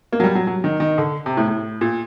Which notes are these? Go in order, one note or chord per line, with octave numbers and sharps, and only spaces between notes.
A#3
F#3
G3
F#3
F#3
D#3
D#3
D3
C3
A2
A2
A#2